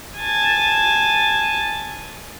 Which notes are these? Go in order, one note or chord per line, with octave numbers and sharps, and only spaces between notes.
G#5 A5